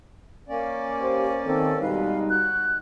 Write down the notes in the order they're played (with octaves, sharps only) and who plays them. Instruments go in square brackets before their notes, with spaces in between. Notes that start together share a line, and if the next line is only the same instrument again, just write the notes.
[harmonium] A#3 C#4 D5
[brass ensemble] G4 C5
[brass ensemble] D#3 C4 [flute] A4
[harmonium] B2 G#3 B4 [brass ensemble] G3 D#4 [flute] F5
[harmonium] F#4 [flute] F#6